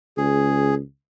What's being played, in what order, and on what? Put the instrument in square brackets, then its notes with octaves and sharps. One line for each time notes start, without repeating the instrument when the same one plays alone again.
[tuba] C#2 [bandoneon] G#4